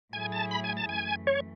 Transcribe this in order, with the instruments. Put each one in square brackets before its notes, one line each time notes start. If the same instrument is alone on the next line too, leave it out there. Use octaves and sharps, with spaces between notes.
[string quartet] A2 F#3 A3 E4 G#4 [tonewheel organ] G#5
[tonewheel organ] A5
B5
G#5
A5
[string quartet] F#2 E3 A3 [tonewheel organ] G#5
[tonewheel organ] C#5